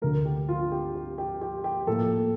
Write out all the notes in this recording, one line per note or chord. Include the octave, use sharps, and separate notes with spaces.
D2 D3 A3 A#4
G4
F4
G4
G4
G4
G4
G4
A2 F3 A#3 A4